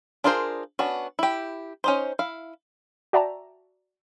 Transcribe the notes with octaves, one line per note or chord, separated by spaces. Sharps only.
D4 F4 G#4 A#4 C5
B3 C#4 D4 F#4
E4 G4
C#4 D#4 C5
E4 F5
F#4 D5 E5 G5 A5 A#5